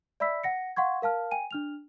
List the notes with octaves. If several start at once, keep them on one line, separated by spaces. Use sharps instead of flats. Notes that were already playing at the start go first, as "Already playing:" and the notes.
D5 E5 B5 E6 B6
F#5 A#6 C#7
F5 F#5 C6 C#6 G#6
A#4 F5 A5 F6
G5 G#5 D#7
D4 F6 F7